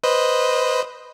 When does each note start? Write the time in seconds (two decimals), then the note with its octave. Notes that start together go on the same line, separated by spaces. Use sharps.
0.03 B4 C5 D#5